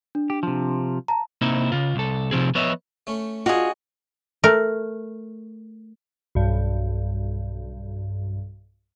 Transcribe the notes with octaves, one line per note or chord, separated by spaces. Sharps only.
D4
G4
C3 F3
A5 A#5
C3 A#3 C4 D#4 E4
C#3 F4
C2 A4
C3 F3 C4 G#4
F3 B3 B4 C#5 D#5 E5
A3 C#4
D4 D#4 F4 F#4 G#4
A3 A#4
B1 G2